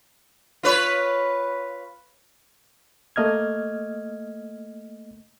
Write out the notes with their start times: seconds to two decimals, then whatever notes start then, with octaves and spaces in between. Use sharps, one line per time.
0.63 F4 B4 C#5
3.16 A3 A#3 D#5 F6 G#6